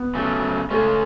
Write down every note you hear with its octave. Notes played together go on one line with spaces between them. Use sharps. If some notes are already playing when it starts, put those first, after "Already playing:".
Already playing: B3
C#3 F#3 A3
C#3 G#3 A3 C#4